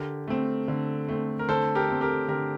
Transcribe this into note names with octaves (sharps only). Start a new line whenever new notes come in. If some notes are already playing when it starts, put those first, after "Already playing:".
Already playing: D3 G4 A#4
A3 C4
D3
A3 C4
A#4
D3 A4 C5
G4 A#4
A3 C4
G4 A#4
D3 G4 A#4